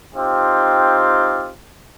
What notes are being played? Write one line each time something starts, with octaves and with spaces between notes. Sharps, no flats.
C4 D#4 F4 G4